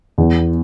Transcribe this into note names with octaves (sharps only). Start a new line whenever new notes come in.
E2